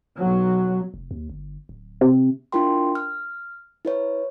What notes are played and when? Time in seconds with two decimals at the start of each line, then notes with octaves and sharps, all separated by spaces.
0.16 B1 F#3
0.94 F1
1.11 D#2
1.30 G1
1.69 D1
2.01 C3
2.52 D4 E4 F4 A#4 G5 C6
2.95 F6
3.85 E4 B4 C#5